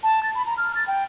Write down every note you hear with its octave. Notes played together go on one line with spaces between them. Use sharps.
A5
A6
B5
A#5
F6
A6
G5